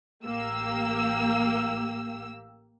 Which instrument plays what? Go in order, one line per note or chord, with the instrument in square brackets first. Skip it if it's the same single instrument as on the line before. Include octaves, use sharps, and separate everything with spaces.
[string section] A1 A#3 G4 E6